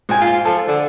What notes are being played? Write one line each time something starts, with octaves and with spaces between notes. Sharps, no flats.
G#2 G#5
F4
F3 A4
D3